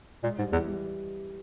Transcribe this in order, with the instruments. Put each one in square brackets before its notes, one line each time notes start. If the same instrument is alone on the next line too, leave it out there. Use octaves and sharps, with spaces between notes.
[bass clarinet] A#2 [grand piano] G#3
[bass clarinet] G#2 [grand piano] G3
[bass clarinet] E2 [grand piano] E3
[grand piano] G3